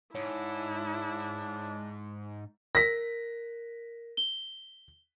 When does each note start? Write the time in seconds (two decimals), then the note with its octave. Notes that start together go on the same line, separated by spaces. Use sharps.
0.15 G#2 D4 E4 C#5
2.75 A#4 A#6 B6
4.17 G7